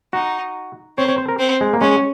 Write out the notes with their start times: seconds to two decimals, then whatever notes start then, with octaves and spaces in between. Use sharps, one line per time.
0.13 D#4 F#4
0.98 C4 C#5
1.08 C#5
1.18 C5
1.28 A#4
1.39 C4
1.61 G#3
1.73 A#3
1.81 G#3 C#4